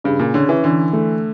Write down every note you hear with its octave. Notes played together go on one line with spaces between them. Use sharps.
G2 C#3
A#2
D3 C#4
E3
D3 E3
A3